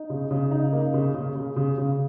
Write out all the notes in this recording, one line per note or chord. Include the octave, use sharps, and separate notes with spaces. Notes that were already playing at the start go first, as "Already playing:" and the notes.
Already playing: D#4
C#3
C#3
D#4
A#3
C#3
C#3
C#3
C#3
C#3